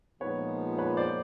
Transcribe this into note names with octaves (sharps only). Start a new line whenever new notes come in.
A#2 F3 G#3 B3 D#4 B4 C#5
B4 C#5
C5 D5